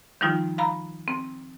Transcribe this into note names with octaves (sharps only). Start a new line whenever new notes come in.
D#3 F3 G3 D#4 F4
F5 A#5 B5
C4